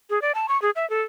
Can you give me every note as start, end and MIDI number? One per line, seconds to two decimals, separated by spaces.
0.10 0.21 68
0.22 0.32 74
0.35 0.46 81
0.49 0.60 85
0.62 0.70 68
0.76 0.88 76
0.90 1.02 69